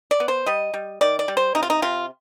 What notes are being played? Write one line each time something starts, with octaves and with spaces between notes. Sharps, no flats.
D5
B3
C5
G3 D#5
G3
D#3 D5
D5
G3
C5
C3 D#4
F4
D#4
C3 F4